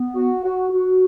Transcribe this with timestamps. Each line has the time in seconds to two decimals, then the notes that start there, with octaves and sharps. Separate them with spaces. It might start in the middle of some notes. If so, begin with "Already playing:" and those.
Already playing: B3
0.16 F#4
0.43 F#4
0.70 F#4